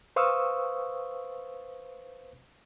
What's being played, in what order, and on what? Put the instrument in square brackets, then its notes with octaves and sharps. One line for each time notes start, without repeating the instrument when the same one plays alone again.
[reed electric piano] B4 C5 F5 C#6 D#6 E6